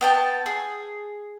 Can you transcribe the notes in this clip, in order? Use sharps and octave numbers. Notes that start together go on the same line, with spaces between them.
B3 G5 A5
G#4